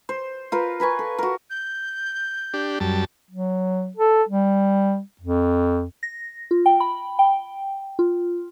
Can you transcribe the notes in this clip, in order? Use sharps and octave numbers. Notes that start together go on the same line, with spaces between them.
C5
F4 A#4 B4
A#4 B4 G#5 C#6
A4
F#4 A#4
G6
D4 G4
F#2 G3 A5
F#3
A4
G3
F2
A#6
F4
G5
B5
G5
F4